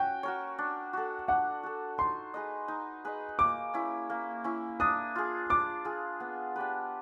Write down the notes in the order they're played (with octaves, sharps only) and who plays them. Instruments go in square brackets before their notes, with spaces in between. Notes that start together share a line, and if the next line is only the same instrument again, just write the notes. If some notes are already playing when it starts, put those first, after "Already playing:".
Already playing: [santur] C#4 F#4 [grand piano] G5
[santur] F#4 A#4 C#5
D4
F#4 A4
[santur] D4 [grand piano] F#5
[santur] F#4 A4
[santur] D#4 [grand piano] C6
[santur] G#4 B4 D#5
D#4
G#4 B4 D#5
[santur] A#3 [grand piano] D6
[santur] C#4 E4
A#3
C#4 E4
[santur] D4 [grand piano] D#6
[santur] F4 G#4
[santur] D4 [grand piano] D6
[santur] F4 G#4
B3
D4 G4 B4